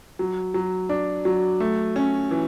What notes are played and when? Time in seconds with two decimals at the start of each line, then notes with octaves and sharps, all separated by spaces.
0.19 F#3
0.54 F#3
0.89 D4
1.25 F#3
1.60 A3
1.96 C#4
2.31 E3